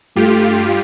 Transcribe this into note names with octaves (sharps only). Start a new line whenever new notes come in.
G2 A3 F4 G4